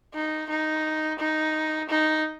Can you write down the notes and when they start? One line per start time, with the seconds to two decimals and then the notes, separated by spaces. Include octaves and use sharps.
0.14 D#4
0.49 D#4
1.19 D#4
1.89 D#4